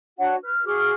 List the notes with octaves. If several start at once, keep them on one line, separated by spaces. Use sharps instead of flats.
D4 F#4 C#5 F#5
B4 F6
F#4 G#4 D6 F6